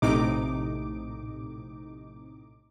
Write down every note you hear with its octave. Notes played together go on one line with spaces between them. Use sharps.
A#1 A2 C3 D#4 D6